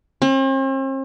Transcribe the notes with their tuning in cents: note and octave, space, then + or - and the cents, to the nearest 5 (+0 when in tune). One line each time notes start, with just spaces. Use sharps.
C4 +45